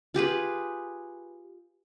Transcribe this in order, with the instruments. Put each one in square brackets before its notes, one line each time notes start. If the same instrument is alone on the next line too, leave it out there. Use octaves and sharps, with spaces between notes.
[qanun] F4 G4 G#4 B4